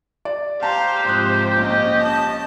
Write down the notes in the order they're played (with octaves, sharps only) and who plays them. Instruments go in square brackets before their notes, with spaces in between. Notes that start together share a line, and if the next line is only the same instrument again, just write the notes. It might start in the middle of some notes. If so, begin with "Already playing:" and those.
[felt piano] D5
[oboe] G4 [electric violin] C5 [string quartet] F5 [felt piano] A5 A#5 C6
[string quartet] G#2 C3 F3 [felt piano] D#6 F#6
[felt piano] A#1 [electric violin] C#4 D#5
[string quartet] A5